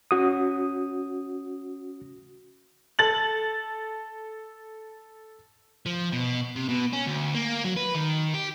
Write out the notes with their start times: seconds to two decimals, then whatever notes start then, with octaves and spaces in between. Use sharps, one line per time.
0.11 C#4 F#4 D#6
2.99 A4 A6 F#7
5.86 F3
6.12 B2
6.56 C3
6.69 B2
6.93 C#4
7.07 D2
7.34 A#3
7.64 F#3
7.76 B4
7.95 D#3
8.34 G4